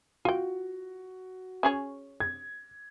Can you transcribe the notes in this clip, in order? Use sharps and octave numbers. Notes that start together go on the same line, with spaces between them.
F4 F#4 G5
C#4 G#4 C#5
G#6